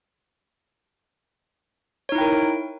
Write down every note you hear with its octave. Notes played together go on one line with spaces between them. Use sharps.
D#4 E4 A#4 C#5 G5